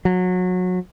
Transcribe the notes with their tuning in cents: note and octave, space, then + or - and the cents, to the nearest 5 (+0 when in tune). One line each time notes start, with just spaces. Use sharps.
F#3 -25